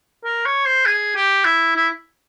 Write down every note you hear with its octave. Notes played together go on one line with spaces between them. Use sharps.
A#4
C#5
C5
G#4
G4
E4
E4